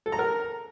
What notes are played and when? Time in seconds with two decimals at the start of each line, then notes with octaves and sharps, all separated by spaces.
0.06 A4
0.12 A#5
0.19 A#4